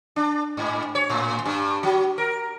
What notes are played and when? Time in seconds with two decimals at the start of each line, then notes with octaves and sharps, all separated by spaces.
0.16 D4
0.57 G#2
0.95 C#5
1.10 A2
1.46 G2
1.83 F#3
2.18 A#4